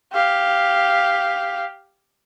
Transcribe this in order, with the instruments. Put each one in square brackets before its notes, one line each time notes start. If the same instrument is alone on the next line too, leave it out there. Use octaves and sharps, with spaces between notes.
[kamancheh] G4 F5